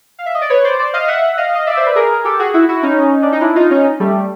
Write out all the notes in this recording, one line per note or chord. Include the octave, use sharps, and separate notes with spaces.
F5
E5
D#5
D5
B4 C#5
C5 D5
C5 D5
D#5 F5
E5 F#5
D#5 F5
D#5
D5 E5
C5
B4
G#4 A#4
G4 A4
F#4 G#4
E4 F#4
E4 F#4
C#4 D#4
D4
D#4
D4 E4
D#4 F4
C#4 D#4
G3 A3